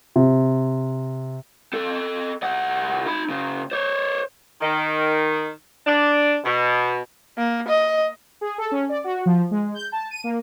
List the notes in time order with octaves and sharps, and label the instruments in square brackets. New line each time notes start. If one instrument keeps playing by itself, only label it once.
[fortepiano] C3
[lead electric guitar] C4 A4
C2 F#5
D#4 B5
F#2 C#3
C5 C#5
[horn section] D#3
D4
B2
[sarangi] A#3
D#5
[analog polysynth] G#4
A4
C#4
D5
F#4
F3
G#3
G6
A5
D#7
A#3